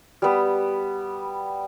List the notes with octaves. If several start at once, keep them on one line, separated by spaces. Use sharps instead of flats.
G3 B3